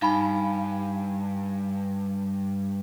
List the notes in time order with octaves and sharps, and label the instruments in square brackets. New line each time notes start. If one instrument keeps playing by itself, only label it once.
[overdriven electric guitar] G2 [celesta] D#4 B5 [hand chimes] F5 G#5